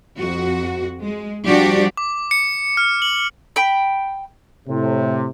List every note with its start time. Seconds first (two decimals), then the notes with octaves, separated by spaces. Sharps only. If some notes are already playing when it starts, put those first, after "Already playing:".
0.18 F2 F#4
1.01 G#3
1.45 F3 G3 D4 F#4 G4 D5
1.97 D6
2.31 C#7
2.77 F6
3.02 F#7
3.56 G5 B5
4.68 A2 C3